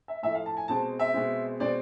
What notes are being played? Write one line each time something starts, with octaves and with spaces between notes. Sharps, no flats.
E5
A2 F3 A3 E5
F5
A5
G#5
B2 G#3 C4 A5
E5
B2 G#3 C4
B2 G#3 C4 D5